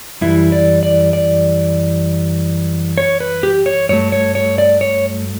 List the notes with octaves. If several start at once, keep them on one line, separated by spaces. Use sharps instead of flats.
F#2 E3 G3 E4
D5
D5
D5
C#5
B4
G4
C#5
G2 F#3 A3 C#5
C#5
C#5
D5
C#5